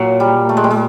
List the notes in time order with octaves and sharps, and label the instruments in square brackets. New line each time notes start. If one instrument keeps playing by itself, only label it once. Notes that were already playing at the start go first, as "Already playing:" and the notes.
Already playing: [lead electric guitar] A#2 [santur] F#3
[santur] G3
A3
G#3
G3
G#3